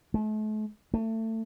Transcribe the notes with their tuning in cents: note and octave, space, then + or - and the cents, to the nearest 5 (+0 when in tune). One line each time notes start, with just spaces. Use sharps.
A3 -40
A3 +25